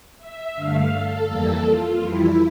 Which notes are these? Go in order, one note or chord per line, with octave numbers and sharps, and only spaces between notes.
E5
G2 D3 A3 F5
A4
F2 E3 G3 A#3 A4
F4
F2 E3 G3 E4